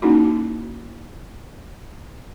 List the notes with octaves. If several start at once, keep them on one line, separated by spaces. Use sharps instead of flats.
A#3 C#4 D#4 E4 F#4